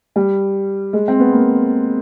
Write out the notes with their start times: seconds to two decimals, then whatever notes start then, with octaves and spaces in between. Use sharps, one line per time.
0.16 G3
0.93 G#3
1.08 C4
1.20 B3
1.32 A#3